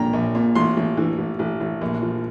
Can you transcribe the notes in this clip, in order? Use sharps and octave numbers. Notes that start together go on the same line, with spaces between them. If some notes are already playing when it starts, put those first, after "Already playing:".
Already playing: A#1 A#2 G5 A#5
A#1
A#2
A1 C6
A1
E3
A1
A1
A1
A#1
F3